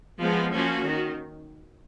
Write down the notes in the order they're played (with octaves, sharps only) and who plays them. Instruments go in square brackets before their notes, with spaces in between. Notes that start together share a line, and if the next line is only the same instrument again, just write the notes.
[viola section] F3 G#3 B3
F3 A#3 C#4 F#4
D#3